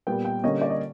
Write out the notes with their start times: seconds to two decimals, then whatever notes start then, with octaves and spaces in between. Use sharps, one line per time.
0.07 A#2 G3 B3 G5
0.25 G5
0.44 D3 G3 A#3 C#4 D#5
0.61 D5
0.70 D#5